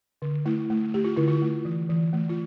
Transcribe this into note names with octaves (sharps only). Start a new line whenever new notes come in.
D3
A3 E4
A3
A3 G4
F4
D3 E4
F4
A3
E3
E3
A3
F4